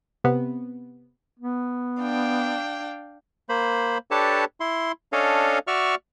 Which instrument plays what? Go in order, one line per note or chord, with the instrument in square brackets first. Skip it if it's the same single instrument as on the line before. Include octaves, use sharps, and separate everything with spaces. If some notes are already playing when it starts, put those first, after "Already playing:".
[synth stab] C3 B3
[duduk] B3
[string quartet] D4 F5 G5
[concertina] A#3 C5 B5
D4 G4 A4 B4 C#5 A5
E4 C6
C#4 D4 A4 C#5 D#5 F5
F#4 D5 E5 C#6 F6